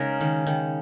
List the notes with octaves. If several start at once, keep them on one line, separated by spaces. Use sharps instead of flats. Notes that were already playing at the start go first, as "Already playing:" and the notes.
Already playing: C#3 G#3 D#4 G#4 A#4
D#3
D#3